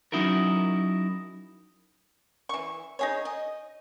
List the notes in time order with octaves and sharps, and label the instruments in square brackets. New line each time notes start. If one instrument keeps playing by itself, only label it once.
[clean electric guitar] F#3 C#4 D#4 E4 F#4 A#4
[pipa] E3 C#6
D#4 G#4 C#5
D#5